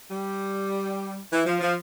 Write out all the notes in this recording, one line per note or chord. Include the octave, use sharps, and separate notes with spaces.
G3
E3
F3
F3